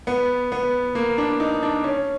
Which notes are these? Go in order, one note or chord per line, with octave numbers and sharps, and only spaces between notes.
B3
B3
A#3
D4
D#4
D4
C#4